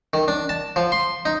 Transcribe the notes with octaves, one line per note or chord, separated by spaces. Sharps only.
D#3
D4
A5
F3
C6
D#4